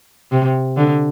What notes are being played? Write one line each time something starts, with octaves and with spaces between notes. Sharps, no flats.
C3
D3